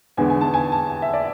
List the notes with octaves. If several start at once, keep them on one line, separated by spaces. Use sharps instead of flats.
E2 D3 G#3 B3 G#5
G#5
A5
G#5
A5
E5
D5